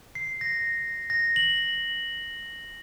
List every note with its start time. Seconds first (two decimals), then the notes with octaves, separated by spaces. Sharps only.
0.15 C7
0.41 A#6
1.10 A#6
1.36 F#7